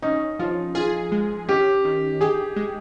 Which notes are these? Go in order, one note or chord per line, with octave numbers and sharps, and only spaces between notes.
C#4 D#4
F3 F4
F4 G#4
G#3
C#4 G4
D#3
G4 G#4
G#3